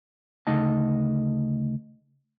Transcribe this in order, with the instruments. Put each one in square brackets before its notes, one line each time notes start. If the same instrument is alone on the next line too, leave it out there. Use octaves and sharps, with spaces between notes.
[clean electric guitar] D2 C#3 A3 D#4 D#5 A5